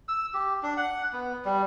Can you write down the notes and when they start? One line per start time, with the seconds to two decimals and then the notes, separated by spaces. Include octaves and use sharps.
0.08 E6
0.34 G4
0.63 D4
0.77 F#5
1.13 B3
1.45 G3